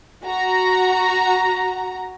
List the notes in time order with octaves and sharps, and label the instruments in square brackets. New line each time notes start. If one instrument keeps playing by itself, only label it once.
[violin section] F#4 A#5